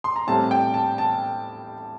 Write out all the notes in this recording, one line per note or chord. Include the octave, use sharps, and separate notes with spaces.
C6
A#5
A2 G3 C4 A5
G5
A5
A5